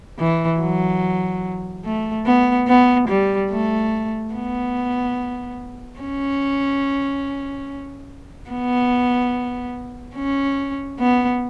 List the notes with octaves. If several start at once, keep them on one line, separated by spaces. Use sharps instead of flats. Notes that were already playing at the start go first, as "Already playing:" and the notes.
E3
F#3
A3
B3
B3
G3
A3
B3
C#4
B3
C#4
B3